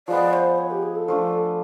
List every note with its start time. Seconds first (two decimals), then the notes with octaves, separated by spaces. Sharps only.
0.08 F3 G#3 B3 D5
0.33 C5
0.58 C#5
0.71 G4
0.83 G#4
0.95 A4
1.08 F3 A3 D4